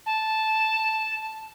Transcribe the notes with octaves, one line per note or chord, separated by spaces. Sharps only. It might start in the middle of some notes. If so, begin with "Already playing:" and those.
A5